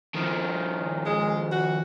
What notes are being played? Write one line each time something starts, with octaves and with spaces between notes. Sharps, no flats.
D#3 F3
G#3
F#4